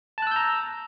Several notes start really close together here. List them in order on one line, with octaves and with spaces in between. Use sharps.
A5 F#6 E6 G6 A#5